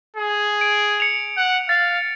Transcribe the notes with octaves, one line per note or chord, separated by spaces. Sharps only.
G#4
D7
C#7 F7
F#5
F5 A6